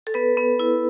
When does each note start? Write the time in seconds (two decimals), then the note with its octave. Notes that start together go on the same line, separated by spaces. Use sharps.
0.07 A4
0.14 B3 B4
0.37 B3
0.59 E4